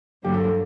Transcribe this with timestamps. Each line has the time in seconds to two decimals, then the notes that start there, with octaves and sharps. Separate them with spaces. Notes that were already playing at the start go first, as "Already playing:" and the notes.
0.24 G2 D3 F#3 A#3 G4
0.34 A4
0.44 A4